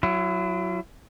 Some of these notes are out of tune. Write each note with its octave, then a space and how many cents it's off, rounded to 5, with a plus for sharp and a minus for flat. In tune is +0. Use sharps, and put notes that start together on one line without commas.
F#3 +0 E4 +35